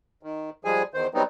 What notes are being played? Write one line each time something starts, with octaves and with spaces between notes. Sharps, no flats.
D#3
F3 G3 G#3 G#4 G#5
E2 D#3 C5
F#3 G3 B3 C4 D#4